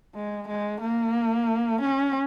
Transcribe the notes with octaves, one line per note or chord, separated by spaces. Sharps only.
G#3
G#3
A#3
C#4